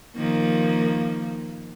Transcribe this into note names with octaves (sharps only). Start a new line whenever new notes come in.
D#3 F3 A#3